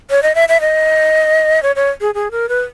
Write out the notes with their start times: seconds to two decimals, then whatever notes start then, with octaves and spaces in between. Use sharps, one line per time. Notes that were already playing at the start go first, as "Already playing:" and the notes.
0.10 C#5
0.23 D#5
0.35 E5
0.49 E5
0.61 D#5
1.63 C#5
1.76 C#5
2.01 G#4
2.15 G#4
2.31 A#4
2.49 B4